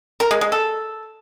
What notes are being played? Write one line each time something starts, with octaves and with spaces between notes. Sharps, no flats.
A#4
G#3
G#3
A4